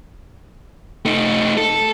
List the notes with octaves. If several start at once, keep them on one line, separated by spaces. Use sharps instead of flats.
A3 D#4
A4